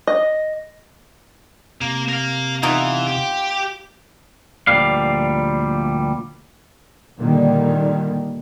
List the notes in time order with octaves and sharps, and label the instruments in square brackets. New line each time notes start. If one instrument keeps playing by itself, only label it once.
[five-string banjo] D#5
[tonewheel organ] C3 [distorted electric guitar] A#3
[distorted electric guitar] A#4 F5
[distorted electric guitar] E3 [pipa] B3 D#4 F4
[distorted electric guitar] G4
[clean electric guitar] D2 A#2 F3 G3 F5
[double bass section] A#2 D3 D#3 G3